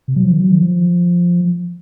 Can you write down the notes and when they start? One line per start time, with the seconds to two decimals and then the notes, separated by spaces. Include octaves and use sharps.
0.08 C3
0.16 F#3
0.23 F3
0.32 D#3
0.40 F#3
0.51 D#3
0.61 F3